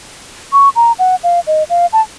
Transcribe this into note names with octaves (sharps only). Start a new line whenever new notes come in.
C#6
A#5
F#5
F5
D#5
F5
A5